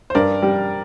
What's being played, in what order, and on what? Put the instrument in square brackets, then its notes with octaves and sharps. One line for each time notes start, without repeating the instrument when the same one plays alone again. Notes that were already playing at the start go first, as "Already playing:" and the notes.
[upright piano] C5
[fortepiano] G2 [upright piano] A#4 D5
[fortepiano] G3